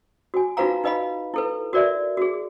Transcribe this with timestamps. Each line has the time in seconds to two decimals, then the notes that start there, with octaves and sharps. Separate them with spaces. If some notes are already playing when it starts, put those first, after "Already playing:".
0.34 F#4 G#5
0.57 D#4 F4 F#4 B4 F5 A#5
0.84 D#4 B4 D#5 F5 B5
1.34 E4 A4 B4
1.73 F#4 A#4 D5 E5
2.17 F#4 G#4